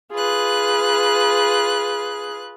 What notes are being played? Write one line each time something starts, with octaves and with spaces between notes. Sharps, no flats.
F4 G#4 B4 F#6